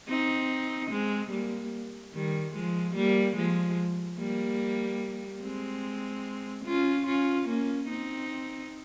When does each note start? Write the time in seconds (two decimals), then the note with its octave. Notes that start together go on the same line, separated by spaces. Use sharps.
0.08 C4 D#4
0.91 G#3 C4
1.32 G3 A#3
2.14 D#3 G3
2.55 F3 G#3
2.96 G3 A#3
3.37 F3 G#3
4.19 G3 A#3
5.43 G#3 C4
6.65 C#4 F4
7.07 C#4 F4
7.48 A#3 C#4
7.89 C4 D#4